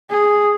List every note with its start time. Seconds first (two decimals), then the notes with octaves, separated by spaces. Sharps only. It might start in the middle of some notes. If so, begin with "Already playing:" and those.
0.10 G#4